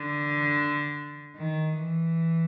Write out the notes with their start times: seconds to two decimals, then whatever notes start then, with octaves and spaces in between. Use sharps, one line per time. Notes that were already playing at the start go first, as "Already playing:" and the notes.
Already playing: D3
1.37 D#3
1.78 E3